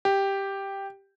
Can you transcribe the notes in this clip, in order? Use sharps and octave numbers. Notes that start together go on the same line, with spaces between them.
G4